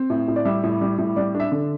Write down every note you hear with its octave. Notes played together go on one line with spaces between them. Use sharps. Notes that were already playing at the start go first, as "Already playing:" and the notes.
Already playing: C4
A2
A2
D5
G3 E5
A2
G3
A2
G3 D5
D4
E5
D3